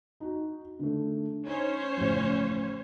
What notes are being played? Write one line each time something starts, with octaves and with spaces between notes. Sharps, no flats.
D#4 F#4
D3 A3
C#4 D#4 C5 C#5
A1 C#3 F3